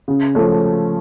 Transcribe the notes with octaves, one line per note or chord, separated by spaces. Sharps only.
C#3
F3 A3 C#4